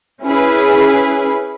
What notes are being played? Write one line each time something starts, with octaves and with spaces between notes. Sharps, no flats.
C#4 E4 G#4 B4